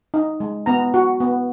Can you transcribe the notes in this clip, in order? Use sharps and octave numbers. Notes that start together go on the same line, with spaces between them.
D#4
G#3
B3 A#5
F#4
B3